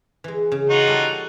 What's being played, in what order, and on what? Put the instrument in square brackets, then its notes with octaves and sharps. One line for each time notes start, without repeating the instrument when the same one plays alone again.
[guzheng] E3 G#3
C#3
[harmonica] D#4 F4 F#4
[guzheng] G3 A4